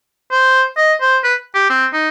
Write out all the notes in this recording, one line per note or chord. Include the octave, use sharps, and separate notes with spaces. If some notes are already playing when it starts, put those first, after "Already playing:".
C5
D#5
C5
B4
G4
C4
D#4